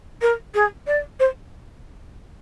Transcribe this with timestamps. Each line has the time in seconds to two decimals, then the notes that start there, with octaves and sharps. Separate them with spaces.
0.22 A#4
0.54 G#4
0.87 D5
1.19 C5